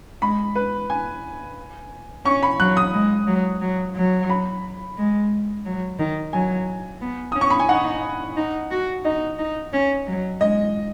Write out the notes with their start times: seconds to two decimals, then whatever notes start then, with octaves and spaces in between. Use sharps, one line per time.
0.22 G#3 B5
0.55 B4
0.90 G#5
2.25 C#4 C#6
2.43 B5
2.60 F#3 F#6
2.77 D#6
2.93 G#3
3.27 F#3
3.61 F#3
3.95 F#3
4.30 B5
4.97 G#3
5.65 F#3
5.99 D#3
6.33 F#3 G#5
7.01 B3
7.32 C#4 D#6
7.41 C#6
7.50 B5
7.60 G#5
7.69 D#4 F#5
8.37 D#4
8.71 F#4
9.05 D#4 D#5
9.39 D#4
9.73 C#4
10.07 F#3
10.40 G#3 D#5